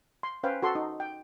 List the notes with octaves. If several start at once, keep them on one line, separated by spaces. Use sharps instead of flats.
C6
C#4 B4 C5 F5 G5
F#4 A4 C6
D#4
G5